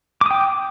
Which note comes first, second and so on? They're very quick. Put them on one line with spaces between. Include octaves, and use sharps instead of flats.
D6 D#6 G5